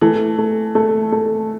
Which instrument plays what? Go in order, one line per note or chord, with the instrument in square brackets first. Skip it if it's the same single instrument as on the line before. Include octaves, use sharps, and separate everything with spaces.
[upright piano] E3 [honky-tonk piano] A3
[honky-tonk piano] A3
A3
A3